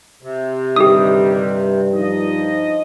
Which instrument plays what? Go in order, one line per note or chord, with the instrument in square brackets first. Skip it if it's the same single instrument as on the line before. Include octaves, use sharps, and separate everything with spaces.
[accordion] C3
[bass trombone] G2 [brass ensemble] D3 D#3 G3 [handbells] G4 D#6
[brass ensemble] F3 D#4 D#5